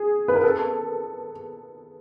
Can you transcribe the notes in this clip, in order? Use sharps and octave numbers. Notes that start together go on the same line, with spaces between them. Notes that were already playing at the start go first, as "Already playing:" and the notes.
Already playing: G#4
B4
A#4
A4